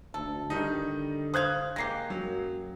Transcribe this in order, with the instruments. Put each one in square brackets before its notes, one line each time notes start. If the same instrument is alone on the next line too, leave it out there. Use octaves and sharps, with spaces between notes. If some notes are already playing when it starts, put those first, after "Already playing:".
[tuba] D2 [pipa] A4
[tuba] D3 [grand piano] D#3 G3 D#4
[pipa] C5 F5 [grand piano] D#6 F#6 G#6
[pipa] G#3 A#3 G4 [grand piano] A#6 C7
[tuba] F#2 [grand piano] F#3